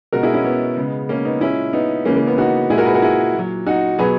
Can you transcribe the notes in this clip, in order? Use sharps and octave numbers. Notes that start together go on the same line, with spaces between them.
B2 G#3 F#4 A#4
E4 G#4
C#4 E4
B3
C#3 G#3
A#3 C#4
B3 D#4
A#2 G#3 C#4 E4
B3 D#4
C#3 E3 G#3 A#3 C#4
A#3
B3
D#4 F#4
A#2 G#3 E4 G#4
F#4 A#4
G#4 B4
F#4 A#4
E4 G#4
A#2 F#3
D#4 F#4
B2 F#3 G#4 B4